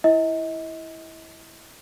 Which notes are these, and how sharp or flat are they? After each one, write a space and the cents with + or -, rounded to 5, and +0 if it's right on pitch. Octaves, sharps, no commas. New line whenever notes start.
E4 +0 D#5 +40